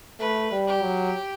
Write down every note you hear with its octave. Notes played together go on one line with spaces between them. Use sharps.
A3 B4
G3
G4
F#3